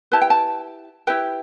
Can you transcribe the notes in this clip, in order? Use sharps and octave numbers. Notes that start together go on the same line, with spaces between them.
E4 G4 B4 A5
G5
A5
E4 G4 B4 G5